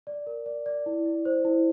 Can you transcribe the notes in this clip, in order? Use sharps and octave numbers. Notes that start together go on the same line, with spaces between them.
D5
A#4
D5
D5
E4
E4
C5
E4